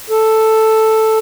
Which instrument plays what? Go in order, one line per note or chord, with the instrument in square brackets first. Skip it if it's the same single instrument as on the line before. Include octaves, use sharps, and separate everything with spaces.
[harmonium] A4